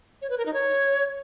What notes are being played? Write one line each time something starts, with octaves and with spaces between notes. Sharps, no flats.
C#5
B4
A#4
D#4
C#5